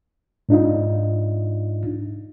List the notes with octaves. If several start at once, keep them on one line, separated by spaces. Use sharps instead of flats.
G#2 D4 D#4 F4